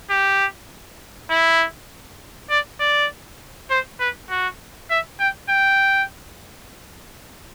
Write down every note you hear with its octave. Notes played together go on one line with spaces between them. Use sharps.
G4
E4
D5
D5
C5
B4
F#4
E5
G5
G5